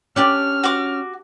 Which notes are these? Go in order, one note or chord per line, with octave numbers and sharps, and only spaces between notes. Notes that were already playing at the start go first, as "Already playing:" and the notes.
C#4 D4 G4 D5 G5 F6
F#4 D6